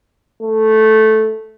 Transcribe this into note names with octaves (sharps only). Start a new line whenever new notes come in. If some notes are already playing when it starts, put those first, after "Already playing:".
A3